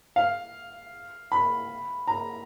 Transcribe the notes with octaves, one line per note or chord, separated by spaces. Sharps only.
F5
B5
A#5